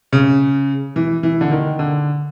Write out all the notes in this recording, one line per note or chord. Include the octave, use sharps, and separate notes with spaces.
C#3
E3
E3
D3
D#3
D3